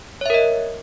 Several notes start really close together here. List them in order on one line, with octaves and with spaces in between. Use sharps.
C#5 E5 A#4 D#5